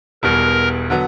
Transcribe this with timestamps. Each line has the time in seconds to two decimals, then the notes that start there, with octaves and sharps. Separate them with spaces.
0.23 E1 E2 B2 G3 A#4
0.90 D3 F#3 B3